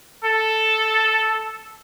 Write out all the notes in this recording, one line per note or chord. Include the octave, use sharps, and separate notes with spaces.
A4